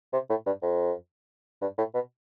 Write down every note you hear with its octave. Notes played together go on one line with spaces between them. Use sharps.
C3
A2
G2
F2
G2
A2
B2